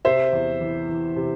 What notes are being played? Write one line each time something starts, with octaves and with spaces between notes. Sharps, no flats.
C3 C5 E5
E2
E3
E3
C3